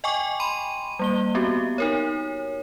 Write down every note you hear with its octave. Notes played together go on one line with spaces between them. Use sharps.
D#5 G5 G#5 C#6 D6
B5 C6 D#7
G3 A#3 G7
B3 C4 F#4 G4
D#4 A#4 C#5